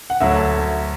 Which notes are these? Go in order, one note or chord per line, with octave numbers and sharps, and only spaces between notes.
F#5
D2 D3 F#3 E5
A5